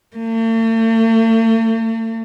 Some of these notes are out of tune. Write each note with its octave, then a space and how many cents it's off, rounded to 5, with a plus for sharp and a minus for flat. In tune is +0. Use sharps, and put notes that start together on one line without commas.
A3 +45